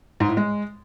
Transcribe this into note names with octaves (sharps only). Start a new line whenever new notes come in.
G#2
A2
G#3